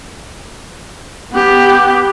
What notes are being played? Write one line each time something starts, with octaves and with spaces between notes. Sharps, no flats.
B3 G4